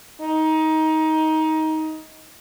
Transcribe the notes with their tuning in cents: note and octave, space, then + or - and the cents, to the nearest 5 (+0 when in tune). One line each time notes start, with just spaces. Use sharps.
D#4 +20